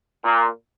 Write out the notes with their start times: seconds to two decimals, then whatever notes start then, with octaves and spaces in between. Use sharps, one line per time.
0.23 A#2